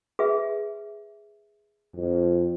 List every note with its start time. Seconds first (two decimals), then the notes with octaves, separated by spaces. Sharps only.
0.19 G#4 B4 E5
1.96 F2